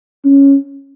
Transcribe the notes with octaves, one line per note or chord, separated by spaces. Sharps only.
C#4